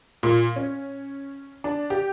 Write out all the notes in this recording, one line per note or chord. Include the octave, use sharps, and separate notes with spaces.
A#2
C#4
D4
G4